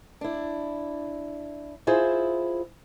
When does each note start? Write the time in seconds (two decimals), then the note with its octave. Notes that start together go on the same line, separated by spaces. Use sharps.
0.21 D4 E4
1.87 E4 F4 G#4 C5 E5